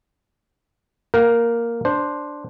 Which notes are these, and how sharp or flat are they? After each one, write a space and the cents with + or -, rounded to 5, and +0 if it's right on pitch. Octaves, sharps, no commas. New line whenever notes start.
A#3 +0 A#4 +0 G5 -45
D4 +0 C5 +0